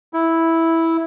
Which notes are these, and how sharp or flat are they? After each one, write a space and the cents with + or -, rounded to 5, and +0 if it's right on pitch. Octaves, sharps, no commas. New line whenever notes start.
E4 -5